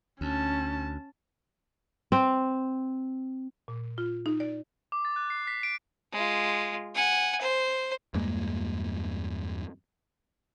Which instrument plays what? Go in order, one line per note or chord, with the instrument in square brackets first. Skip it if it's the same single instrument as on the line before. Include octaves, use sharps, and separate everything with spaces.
[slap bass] D2 [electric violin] C#4 A5
[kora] C4
[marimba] A#2
F4
D#4
D5
[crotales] D6
A6
F#6
C7
B6
D7
[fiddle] G#3 F4
F#5 G#5
C5
[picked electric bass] E2 G2 G#3 A#3